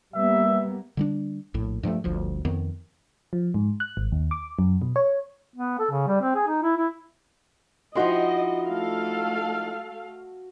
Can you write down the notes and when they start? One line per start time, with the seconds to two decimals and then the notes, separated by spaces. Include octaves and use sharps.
0.14 G3 A#3 B3 E5
0.97 D3 G3 D4
1.54 A#1 A2
1.83 G2 F3 F#3 A3
2.04 G1 D2 F3
2.45 F2 D#3 B3
3.33 F3
3.54 G#2
3.80 F#6
3.97 G#1
4.12 D#2
4.31 D6
4.59 F#2
4.82 B2
4.96 C#5
5.56 B3
5.79 A4
5.91 C#3
6.07 G3
6.21 C4
6.35 G#4
6.48 D#4
6.63 E4
6.77 E4
7.95 F3 D#4 E4 F#4 D#5 C6
8.68 A3 A4 F5